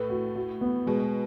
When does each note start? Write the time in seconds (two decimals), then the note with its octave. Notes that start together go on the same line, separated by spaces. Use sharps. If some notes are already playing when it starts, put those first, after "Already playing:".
Already playing: A2 A4 B4
0.10 F#4
0.35 F#4
0.61 B3
0.87 B2 G#3